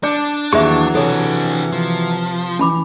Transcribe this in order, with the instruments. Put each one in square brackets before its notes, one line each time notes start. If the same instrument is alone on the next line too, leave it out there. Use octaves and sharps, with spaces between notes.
[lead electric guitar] D4 [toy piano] D5 [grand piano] D6 G6 C#7
[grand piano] D#2 [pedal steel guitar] E3 F#3 C#6 [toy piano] G#4 E5
[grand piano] C3 [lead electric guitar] D4 G#4 [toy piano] A4 C#5
[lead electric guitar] F3
[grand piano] E3 [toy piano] C#4 B5 D6